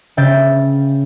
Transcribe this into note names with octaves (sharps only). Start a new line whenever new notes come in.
C#3 E5 G5 G6 A6 D7